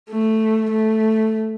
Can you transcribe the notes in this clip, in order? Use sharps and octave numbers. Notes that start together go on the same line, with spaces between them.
A3
A3